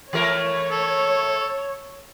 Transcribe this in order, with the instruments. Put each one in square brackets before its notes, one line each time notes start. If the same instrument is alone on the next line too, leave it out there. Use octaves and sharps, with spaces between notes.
[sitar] E3 A3 A#4 [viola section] C#5
[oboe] A4